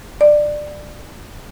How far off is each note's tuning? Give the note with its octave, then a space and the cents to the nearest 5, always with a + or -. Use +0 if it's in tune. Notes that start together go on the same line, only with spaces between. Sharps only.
D5 +15